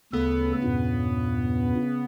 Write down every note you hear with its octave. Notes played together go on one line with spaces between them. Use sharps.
D2 C#3 B3 A4
E2 G2 A#2